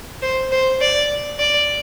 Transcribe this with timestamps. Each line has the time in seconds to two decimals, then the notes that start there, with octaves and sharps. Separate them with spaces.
0.22 C5
0.51 C5
0.81 D5
1.39 D5